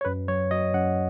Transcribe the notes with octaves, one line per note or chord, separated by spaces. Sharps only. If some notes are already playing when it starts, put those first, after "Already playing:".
C#5
F#2 B4
F#3 C#5
F#3 D#5
F#2 F#5